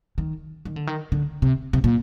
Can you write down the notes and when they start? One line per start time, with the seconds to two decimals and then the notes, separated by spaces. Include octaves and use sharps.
0.18 D#3
0.65 D#3
0.76 D3
0.87 D#3
1.12 D3
1.42 C3
1.73 C3
1.84 A#2